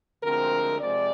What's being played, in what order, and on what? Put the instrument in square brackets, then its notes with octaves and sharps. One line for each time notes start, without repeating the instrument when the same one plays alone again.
[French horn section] D2 D3 F3 G#3 C4 A#4
C3 F3 G#3 C4 D5